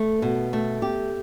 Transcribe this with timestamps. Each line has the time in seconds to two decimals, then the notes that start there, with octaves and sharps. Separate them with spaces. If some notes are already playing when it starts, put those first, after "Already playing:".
Already playing: A3
0.22 B2
0.53 A3
0.82 G4